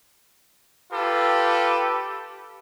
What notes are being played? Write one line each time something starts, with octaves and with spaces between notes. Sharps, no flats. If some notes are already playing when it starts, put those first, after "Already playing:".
F4 G4 A4 B4